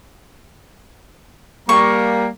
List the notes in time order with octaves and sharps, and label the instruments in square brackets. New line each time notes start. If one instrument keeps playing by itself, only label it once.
[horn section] G3 A#3 A#5 [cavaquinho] C#6